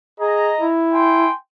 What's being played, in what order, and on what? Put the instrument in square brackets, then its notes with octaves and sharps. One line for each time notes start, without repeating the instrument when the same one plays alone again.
[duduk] G#4 [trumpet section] D#5 A#5
[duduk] E4
[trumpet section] G5 G#5 C6